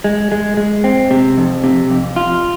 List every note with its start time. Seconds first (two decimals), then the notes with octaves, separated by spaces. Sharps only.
0.04 G#3
0.32 G#3
0.57 G#3
0.84 C4
1.11 C3
1.38 F2
1.64 C3
1.90 F2
2.16 F4